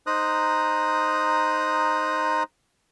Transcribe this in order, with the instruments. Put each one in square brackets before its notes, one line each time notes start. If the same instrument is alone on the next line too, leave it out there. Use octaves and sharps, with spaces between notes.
[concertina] D#4 C5 A#5 D#6 F#6